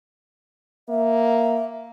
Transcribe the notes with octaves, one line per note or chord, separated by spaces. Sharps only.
A#3 E5